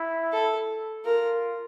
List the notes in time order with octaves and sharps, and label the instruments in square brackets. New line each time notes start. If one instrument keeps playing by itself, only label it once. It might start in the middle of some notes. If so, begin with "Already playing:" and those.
Already playing: [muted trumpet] E4
[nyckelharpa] A4
[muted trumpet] F4 [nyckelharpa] A#4